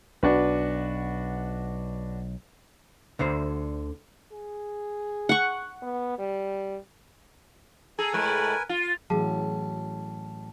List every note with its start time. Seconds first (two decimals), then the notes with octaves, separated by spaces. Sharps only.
0.23 B1 D4 F#4 B4
3.19 D2 D3 C5
4.32 G#4
5.29 F#5 C#6
5.82 B3
6.18 G3
7.99 G#4 A4 G#5 A#5
8.13 A2 G#3 A3 A#4 B4 G#5
8.69 F4
9.10 A1 E3 F#3 F#4 G#4 F5 A5